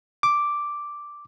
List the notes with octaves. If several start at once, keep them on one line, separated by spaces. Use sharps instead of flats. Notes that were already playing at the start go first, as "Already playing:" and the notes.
D6